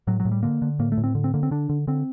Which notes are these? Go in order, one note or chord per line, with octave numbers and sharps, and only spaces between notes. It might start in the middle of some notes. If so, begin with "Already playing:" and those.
A2 F#3
F#3
A2
G3
D3 A#3
D3
A2 A#3
A3
A2
C4
D3
C4
D3 A#3
C4
D3 D4
D3
D3 C4